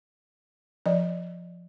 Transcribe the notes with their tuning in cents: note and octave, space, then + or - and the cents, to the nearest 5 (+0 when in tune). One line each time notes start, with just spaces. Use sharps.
F3 +5 D5 -10